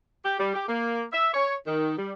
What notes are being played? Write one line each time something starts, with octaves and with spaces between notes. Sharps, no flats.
G4
G3
G4
A#3
E5
C#5
D#3
G3